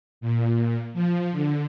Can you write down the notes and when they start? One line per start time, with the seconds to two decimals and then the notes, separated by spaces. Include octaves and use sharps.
0.21 A#2
0.93 F3
1.32 D3